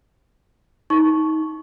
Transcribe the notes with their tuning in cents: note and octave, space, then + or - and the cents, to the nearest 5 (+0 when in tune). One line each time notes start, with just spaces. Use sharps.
D#4 +25 C#6 +0